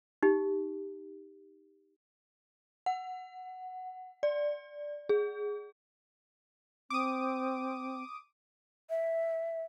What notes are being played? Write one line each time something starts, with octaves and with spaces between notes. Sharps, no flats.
D#4 G4
F#5
D5
G#4
C4 D6 D#6
E5